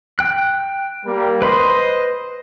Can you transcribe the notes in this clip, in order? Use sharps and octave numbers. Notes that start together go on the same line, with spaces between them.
G5 F#6
G3 A#3 A#4
B4 C5 D#5 B5 C6